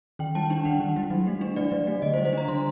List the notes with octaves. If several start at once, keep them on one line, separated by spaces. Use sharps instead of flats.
D#3 G5
G3 A5
D4 G5
D#3 F#5
D#3
G3
F#3
A3
D4
F#3 D5
F#3
A3
D3 D#5
C5
G3
C5
D4 A#5
D3 C6